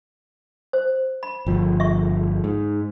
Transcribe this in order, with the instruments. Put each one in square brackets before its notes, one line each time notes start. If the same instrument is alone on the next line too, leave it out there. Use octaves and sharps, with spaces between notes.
[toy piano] C5
B5
[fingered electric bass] G1 F3
[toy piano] E5 C#6
[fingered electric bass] G#2